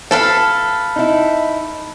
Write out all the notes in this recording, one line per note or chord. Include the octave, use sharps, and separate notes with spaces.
A4 B4 F5 A5
D#4 E4